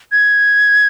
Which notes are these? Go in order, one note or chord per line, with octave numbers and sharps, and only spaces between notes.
G#6